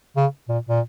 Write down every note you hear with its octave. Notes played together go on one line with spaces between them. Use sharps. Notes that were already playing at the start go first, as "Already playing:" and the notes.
C#3
A#2
A#2